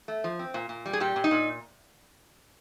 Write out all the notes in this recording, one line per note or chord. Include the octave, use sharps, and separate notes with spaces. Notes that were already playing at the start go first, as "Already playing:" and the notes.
A3
F3
C4
A#2
A#2
G3
G#4
A#2 G4
A#2
D#4
A#2